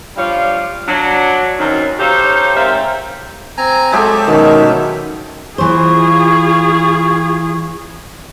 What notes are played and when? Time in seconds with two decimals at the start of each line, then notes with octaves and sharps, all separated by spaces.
0.17 F3 G3 D4 F4 C#5 F5
0.87 F#3 D4
1.59 F#2 D#3 F#3 C4 C#5
2.00 D#4 G4 A4 C5 C#5 F5
2.55 G#2 C4 A#4 C5 E5 F5
3.58 C4 G#5 A#5
3.92 F#3 G#3 G4 A4 E5
4.28 B2 D#3 C#4
5.58 E3 F4 G#4 C5 C#6